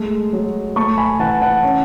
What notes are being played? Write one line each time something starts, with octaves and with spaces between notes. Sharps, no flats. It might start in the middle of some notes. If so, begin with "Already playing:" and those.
Already playing: G#3 A3
F#3
A3 A5 C#6
G#5 B5
E3 F#5 A5
F#5 A5
C#4